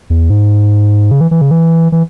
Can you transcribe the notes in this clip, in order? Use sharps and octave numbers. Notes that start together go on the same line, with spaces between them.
E2
G#2
C#3
E3
E3
C#3
E3
E3